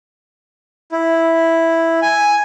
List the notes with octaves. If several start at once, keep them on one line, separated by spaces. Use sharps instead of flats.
E4
G#5